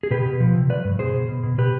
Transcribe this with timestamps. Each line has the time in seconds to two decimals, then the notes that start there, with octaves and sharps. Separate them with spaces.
0.03 G#4
0.11 B2 G4 B4
0.25 B2
0.40 F3
0.55 C3
0.70 F3 B4 D5
0.85 G2
0.99 B2 G#4 C5
1.14 B2
1.28 B2
1.43 B2
1.58 B2 G4 B4